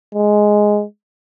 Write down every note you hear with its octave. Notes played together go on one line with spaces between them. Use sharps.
G#3